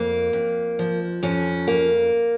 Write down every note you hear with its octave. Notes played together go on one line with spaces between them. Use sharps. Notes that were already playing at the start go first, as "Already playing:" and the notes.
Already playing: F2 A#3
F2
F3
F2 C#4
A#3